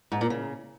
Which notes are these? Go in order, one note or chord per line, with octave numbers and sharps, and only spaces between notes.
G#2
A#2
C#3